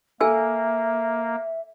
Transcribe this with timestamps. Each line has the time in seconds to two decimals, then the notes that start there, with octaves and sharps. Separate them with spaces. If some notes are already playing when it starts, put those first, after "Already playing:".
0.21 A#3 A4 E5 G#5 E6